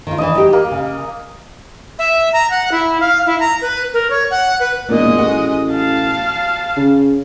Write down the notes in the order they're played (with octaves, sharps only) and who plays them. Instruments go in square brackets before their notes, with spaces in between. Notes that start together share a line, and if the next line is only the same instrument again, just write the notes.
[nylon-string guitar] D#3 F4
[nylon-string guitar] E3 D4 [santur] D#5
[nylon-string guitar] D#4 G4
[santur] A#3
[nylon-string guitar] C#3
[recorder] E5
A#5
F#5
E4
F5
E4
A#5
B4
A#4
C#5
F#5
B4
[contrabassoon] E1 [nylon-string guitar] A#2 A#3 [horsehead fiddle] G#3 D#5
[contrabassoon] A1 [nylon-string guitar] F#4
[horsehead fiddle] F5 A5
[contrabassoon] C#3